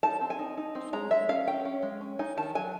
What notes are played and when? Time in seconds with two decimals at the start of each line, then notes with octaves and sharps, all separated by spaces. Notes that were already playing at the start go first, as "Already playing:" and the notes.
0.03 D#4 A5
0.21 C4
0.30 G#5
0.39 D#4
0.57 D#4
0.75 C4
0.93 G#3 A#5
1.11 G#3 E5
1.29 C#4 F5
1.47 C#4 G5
1.65 C#4
1.83 G#3
2.01 C#4
2.19 D#4 G#5
2.37 D#3 A5
2.55 F#3 G#5